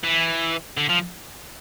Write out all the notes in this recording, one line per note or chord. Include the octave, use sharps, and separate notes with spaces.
E3
D3
F3